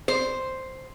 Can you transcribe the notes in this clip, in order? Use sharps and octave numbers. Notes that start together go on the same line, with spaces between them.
C5